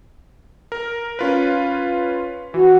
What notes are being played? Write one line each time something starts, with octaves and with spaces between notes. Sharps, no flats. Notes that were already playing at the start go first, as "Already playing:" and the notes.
A#4
C#4 F4 B4
E3 F#4